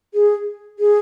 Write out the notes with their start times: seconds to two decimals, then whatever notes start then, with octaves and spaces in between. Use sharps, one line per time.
0.14 G#4
0.79 G#4